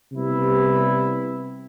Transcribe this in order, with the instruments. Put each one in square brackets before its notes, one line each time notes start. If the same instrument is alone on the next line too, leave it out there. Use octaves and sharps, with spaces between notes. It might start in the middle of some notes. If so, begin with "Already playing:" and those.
[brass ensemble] C3 G3 B3 E4